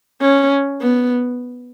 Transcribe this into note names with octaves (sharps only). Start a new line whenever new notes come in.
C#4
B3